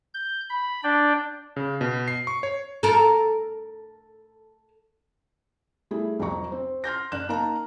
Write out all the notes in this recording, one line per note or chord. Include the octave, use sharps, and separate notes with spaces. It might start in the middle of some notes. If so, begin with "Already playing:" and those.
G6
B5
D4 D5 G5
C#3
B2
C7
C#6
C#5
A4 A#4
G3 A3 E4 G#4
C2 F2 F#3 A#5 C#6
C4
C6 F6 G6 A#6
F#1 D5 F#6 E7
A#3 D#4 A#4 F5 A5 A#5